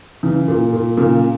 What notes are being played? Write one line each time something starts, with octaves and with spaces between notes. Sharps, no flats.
C#3 E3
A#2
A#2
A#2 C#3